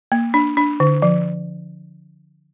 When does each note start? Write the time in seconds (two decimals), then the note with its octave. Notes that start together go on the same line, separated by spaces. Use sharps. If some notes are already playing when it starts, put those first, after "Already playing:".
0.12 A#3
0.34 D4
0.57 D4
0.80 D3
1.02 F3